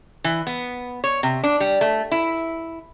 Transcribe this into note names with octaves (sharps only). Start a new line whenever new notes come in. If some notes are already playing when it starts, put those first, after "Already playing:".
E3
B3
C#5
C3
D4
G3
A3
E4